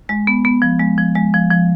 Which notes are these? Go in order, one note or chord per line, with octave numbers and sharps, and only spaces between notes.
G#3
B3
B3
F3
G#3
F3
G#3
F3
F3